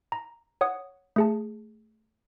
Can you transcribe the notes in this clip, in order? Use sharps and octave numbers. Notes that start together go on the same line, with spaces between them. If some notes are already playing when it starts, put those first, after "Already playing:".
A#5
C#5 F#5 D#6
A3 G#4 A5